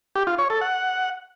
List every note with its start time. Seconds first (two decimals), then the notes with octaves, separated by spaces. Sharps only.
0.16 G4
0.27 F4
0.38 C#5
0.50 A4
0.61 F#5